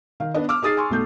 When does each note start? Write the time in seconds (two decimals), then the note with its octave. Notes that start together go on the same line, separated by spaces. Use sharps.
0.20 D#3 F5
0.34 B3 D4 D#5
0.49 D6 E6 F6
0.62 D#4 G#4 D#6 A6 C7
0.77 G#5 C6 C#6
0.90 B1 A3 G6